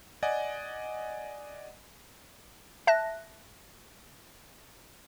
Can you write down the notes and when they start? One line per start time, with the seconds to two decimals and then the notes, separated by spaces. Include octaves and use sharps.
0.23 D5 D#5 F#5 G#5
2.87 E5 A5 F#6 A#6